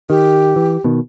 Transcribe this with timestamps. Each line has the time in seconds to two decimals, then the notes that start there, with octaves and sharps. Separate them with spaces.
0.10 D#3 G4
0.56 E3
0.84 B2 D#3